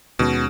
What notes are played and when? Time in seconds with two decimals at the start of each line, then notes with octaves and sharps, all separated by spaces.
0.19 D#2 B2 D#3 G#3 C#4